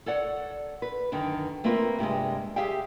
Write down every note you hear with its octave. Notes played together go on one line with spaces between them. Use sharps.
A4 C#5 D5 F#5
B4
F#2 D3 D#3
A3 A#3 C4 F4 A4 B4
G2 C3 G3 G#3
G4 G#4 E5 F5 G5